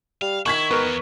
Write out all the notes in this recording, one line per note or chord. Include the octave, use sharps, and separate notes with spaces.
G3 F5
D#3 E4 C#6 G#6 B6
G#2 B3 A#4
E2